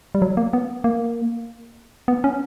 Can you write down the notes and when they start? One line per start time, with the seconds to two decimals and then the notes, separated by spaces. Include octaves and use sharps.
0.15 G3
0.22 F#3
0.37 A#3
0.53 B3
0.84 A#3
2.08 B3
2.24 C#4